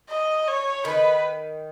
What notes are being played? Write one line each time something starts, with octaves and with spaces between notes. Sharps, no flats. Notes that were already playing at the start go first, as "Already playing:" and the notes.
D#5
C#5
D#3 B4